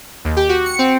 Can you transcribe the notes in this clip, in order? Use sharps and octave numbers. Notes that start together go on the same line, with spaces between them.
D#2
G4
F#4
C#7
C4